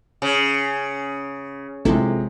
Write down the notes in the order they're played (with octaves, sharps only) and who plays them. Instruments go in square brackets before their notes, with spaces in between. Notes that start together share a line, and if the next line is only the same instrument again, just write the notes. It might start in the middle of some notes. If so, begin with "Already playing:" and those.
[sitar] C#3
[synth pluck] A1 E4 A4 [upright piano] C3 F3 G#3